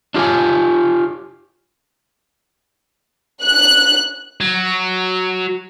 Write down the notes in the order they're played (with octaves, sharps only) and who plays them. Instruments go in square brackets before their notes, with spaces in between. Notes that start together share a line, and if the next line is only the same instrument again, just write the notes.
[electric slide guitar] D4 F4 G4 C#5 G#5
[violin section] F#6
[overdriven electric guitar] F#3